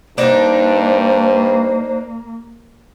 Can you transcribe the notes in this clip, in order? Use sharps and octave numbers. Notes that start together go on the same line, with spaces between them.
G2 A#3 D4 D#4 C5